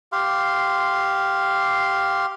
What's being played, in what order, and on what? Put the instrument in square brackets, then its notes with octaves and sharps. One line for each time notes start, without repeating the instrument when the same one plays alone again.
[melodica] G4 F5 C6